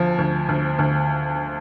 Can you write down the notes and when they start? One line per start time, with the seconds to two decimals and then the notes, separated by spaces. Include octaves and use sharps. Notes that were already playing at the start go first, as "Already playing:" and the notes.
Already playing: D2 F3
0.18 D2
0.49 D2
0.79 D2